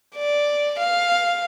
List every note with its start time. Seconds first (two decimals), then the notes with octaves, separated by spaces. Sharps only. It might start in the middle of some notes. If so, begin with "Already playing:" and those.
0.16 D5
0.80 F5